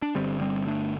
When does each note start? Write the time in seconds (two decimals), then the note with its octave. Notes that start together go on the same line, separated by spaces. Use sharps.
0.02 D4
0.15 G1 G2 D3 G3 C4
0.41 G3 C4
0.67 A3 D4